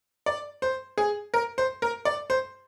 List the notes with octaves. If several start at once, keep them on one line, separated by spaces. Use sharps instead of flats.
D5
C5
G#4
A#4
C5
A#4
D5
C5